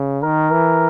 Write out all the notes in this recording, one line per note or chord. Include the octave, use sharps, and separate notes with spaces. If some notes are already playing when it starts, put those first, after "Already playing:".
Already playing: C#3
D#3 A#4
E3